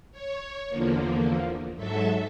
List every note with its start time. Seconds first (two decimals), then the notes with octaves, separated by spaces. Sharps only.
0.12 C#5
0.69 E2 D3 F3 A#3
1.76 G#2 F#3 A4 E5